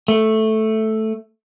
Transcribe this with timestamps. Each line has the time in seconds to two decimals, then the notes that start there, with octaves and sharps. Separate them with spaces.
0.08 A3